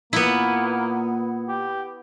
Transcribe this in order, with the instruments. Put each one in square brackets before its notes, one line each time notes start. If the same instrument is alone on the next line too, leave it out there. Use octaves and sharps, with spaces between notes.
[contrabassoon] A#2 [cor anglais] A#3 [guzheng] B3 E4
[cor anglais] G4